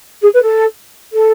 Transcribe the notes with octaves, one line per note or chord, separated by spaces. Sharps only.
G#4
B4
A4
A4